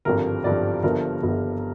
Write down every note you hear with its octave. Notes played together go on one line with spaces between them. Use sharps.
G#1 G2 D3 F3 A#4
G#1 G2 D3 F3 D5
G1 G2 D3 F3 A#4
G1 G2 D3 F3